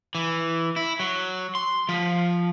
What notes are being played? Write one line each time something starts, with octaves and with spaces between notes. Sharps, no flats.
E3
E4
F#3
C6
F3